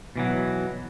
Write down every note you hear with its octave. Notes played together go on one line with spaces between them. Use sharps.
B2 E3 F#3